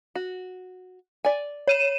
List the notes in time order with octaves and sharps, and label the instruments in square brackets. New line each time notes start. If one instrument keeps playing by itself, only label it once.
[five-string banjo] F#4
D5 G#5
[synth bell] C#5 D#7 E7